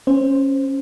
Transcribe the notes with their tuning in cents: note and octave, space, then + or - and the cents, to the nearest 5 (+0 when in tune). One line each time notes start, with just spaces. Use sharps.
C#4 -15 C5 +0